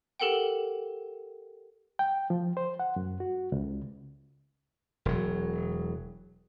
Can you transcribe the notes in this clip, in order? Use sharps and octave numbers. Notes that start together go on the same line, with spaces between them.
G4 A4 A#4 F#5 G5
G5
F3
C5
F#5
F#2
F#4
C#2
E1 F#3